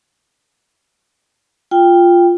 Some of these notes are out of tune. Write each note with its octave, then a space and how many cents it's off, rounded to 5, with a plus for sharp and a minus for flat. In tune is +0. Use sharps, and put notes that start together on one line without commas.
F4 +0 G5 +10